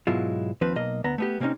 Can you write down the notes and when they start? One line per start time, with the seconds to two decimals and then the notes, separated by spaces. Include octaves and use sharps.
0.07 G#2 B2 F#3 G#3 E4 F4
0.61 D#2 F3 C4 B4
0.76 B1 A#3 D#5
1.04 D2 B3 A#5
1.18 A3 B3 G4
1.40 C3 A#3 C4 C#4 D#4